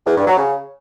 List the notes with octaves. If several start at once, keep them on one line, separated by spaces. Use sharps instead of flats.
E2
G2
F#3
C#3